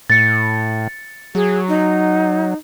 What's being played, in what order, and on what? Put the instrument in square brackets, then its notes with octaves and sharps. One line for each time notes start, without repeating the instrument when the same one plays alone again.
[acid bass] A2 [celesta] A6 C#7
[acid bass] F#3 [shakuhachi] G#4
[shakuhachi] D#4